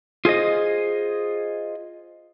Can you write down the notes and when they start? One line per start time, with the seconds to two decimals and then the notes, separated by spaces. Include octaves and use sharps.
0.25 F4 G#4 C5 D#5